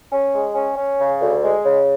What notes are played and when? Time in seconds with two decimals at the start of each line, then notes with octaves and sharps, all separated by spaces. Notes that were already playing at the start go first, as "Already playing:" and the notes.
0.11 C#4
0.33 G#3
0.55 C#4
0.77 C#4
0.99 C#3
1.21 D2
1.43 G#3
1.65 C#3